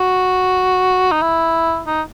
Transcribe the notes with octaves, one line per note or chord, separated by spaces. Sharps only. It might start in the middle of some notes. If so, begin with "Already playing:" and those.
Already playing: F#4
D#4
E4
D#4